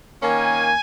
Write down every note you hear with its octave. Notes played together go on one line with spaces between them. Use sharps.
D#3 A#3 C#4 G#5